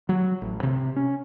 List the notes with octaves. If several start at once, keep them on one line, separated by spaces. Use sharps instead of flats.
F#3
A1
C3
C#4